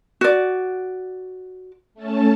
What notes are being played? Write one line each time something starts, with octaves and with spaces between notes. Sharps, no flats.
F#4 D5
A3 C#4 A5